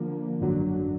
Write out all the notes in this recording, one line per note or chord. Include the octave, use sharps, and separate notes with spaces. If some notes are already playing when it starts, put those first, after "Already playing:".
Already playing: D3 F3 A#3
G#1 F#2 D3 F#3